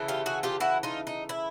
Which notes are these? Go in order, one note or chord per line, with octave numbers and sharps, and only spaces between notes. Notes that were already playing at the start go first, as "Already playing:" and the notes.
Already playing: C#3 E3 A3
F4 G4
F#4 G#4
F4 G4
E4 F#4
D#4 F4
D#4
E4